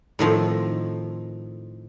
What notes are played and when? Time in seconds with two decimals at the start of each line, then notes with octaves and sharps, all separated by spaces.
0.19 A2 D#3 F3 C4